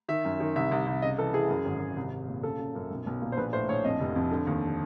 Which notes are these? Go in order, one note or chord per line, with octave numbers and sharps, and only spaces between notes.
D#3 E5
F#2
D#3
C2 E5
C2
C2
C#3 D#5
E3 A4
E3 G#4
F#2
G#1
G#1
C2
C2
A#2
C#3 A4
C#3
F#2
B1
B1
A#2
C5
A#1 B4
A2 C5
A#1 C#5
F2 D#5
F1
F2
D3
D#2